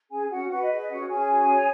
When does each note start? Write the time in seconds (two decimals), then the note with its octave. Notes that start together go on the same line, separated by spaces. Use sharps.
0.10 C#4 G#4 G#5
0.30 C#4 F#4 F#5
0.50 F#4 B4 F#5
0.63 D#5
0.69 G#4
0.76 D#5
0.89 C#4 F#4 F#5
1.09 C#4 G#4 G#5
1.28 F#4
1.48 C#5